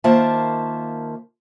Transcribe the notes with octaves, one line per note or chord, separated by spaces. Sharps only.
D#3 A#3 F4 C5 E5 A5